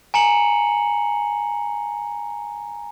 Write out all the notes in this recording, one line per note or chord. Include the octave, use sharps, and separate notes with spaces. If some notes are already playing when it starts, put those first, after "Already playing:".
G#5 A#5 C#7 F#7